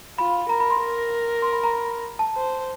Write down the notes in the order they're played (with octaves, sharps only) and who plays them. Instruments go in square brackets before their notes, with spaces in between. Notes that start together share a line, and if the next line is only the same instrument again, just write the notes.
[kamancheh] F4 [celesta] B5
[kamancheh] A#4 [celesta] A#5
[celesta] B5
C6
[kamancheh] A#4
[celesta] C6
B5
A#5
B5
A5
[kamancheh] C5